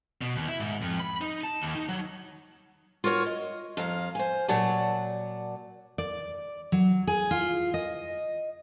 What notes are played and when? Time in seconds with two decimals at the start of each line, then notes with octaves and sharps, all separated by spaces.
0.22 B2
0.36 D#2
0.48 E4
0.60 G#2
0.82 F2
1.00 B5
1.21 D#4
1.43 A5
1.62 D#2
1.75 D#4
1.89 F#3
3.04 F4 F#4 A#4 C#5
3.26 D#5
3.77 F2 F5 A#5
4.15 C5 G#5
4.48 A#2 F#3 C#5 D5 F#5 A5
5.98 D5
6.72 F#3
7.07 G#4
7.31 F4
7.74 D#5